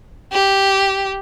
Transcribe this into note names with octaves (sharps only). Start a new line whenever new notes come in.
G4